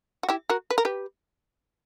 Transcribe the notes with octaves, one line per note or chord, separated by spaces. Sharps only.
F#4
E4 G4
F#4 A#4
B4
A#4
G4 B4